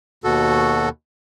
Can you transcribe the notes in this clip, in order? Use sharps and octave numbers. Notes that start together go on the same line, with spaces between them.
D#2 B2 F#4 A4